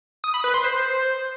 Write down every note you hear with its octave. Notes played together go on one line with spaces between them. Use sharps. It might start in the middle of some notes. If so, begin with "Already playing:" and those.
D#6
B5
B4
C6
C5